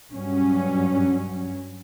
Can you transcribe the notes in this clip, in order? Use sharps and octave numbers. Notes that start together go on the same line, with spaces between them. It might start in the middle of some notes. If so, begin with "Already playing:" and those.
G2 F#3 C#4